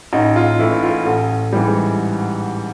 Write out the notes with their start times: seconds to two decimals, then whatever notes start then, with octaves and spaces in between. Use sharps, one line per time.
0.13 A1 D#4
0.36 F4
0.59 A2 E3 E4
0.83 F4
1.06 A1 A4
1.52 G#2 E3 G3